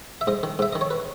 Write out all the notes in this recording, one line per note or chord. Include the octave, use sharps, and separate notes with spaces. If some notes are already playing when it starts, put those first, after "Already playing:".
E5
G#2 D#5
D#3
G#2 E5
D#3 D#5
C#5
B4